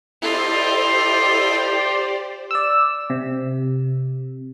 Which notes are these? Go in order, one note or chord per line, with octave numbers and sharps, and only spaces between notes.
E4 F4 G4 A4 C5 D5 D#5
D5 E6
C3